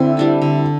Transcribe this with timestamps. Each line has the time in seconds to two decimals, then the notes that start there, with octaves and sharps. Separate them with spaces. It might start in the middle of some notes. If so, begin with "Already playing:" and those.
Already playing: D3 C4 E4
0.17 G3 D4 A4
0.42 D3